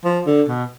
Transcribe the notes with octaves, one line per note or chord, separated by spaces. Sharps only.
F3
D3
B2